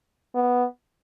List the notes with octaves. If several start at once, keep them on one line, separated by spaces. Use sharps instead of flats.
B3